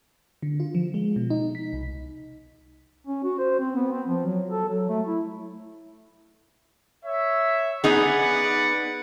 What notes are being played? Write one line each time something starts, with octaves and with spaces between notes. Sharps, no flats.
D3
F4
F3
G#3
B2
D#4
B6
C2
C#4
F#4
C5
C4
B3
C4
F3
F#3
A4
F#3
A3
E4
C#5 E5
B3 D#4 G#4 B4 D5 F#5